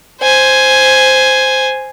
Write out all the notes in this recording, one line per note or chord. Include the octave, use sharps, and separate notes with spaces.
C5 G#5